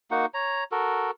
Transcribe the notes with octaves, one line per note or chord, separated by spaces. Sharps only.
A#3 D#4 F#4 F#5
C#5 A#5
F#4 A4 A#4